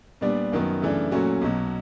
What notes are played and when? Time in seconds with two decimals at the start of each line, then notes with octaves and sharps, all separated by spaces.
0.21 A#2 G3 B3 D4
0.52 F#2 D#3 F#3 B3
0.82 F#2 C#3 E3 A3 D4
1.11 A#2 F#3 A3 C#4 F#4
1.41 B1 B2 F#3